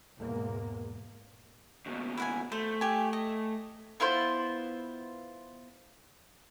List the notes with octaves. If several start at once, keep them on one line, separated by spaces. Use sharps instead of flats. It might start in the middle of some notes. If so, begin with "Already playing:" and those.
E2 G#2 B2 G#3 A#3
D#2 B2
E4 F#5 G#5
A3 C5
G4 G#5
D#5
B3 E4 F4 C5